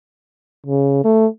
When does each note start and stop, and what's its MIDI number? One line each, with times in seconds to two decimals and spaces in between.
0.66 1.03 49
1.04 1.27 57